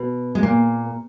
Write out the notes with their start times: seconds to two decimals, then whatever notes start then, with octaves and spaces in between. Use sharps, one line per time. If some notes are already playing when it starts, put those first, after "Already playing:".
Already playing: B2
0.35 G#3
0.43 A#2 A#3